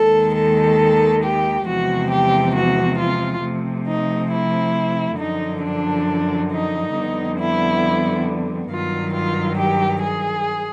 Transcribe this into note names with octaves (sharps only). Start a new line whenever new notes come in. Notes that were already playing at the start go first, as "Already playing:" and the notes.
Already playing: D#2 D#3 G#3 A4
A4
G4
E2 C3 F3 G#3 F#4
G4
F#4
F4
C3 F3 A3
D#4
E4
F#2 D3 F3 D#4
D4
D#4
F2 D3 G3 B3
E4
G2 D#3 F#3 F4
F4
G4
G#4